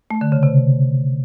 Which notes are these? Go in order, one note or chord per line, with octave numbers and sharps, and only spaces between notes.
A3
D3
C#3
C3